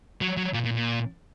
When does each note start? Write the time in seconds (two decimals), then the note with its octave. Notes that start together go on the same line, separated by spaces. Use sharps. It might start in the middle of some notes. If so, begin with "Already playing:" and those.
0.21 F#3
0.37 F#3
0.53 A#2
0.65 A#2
0.76 A#2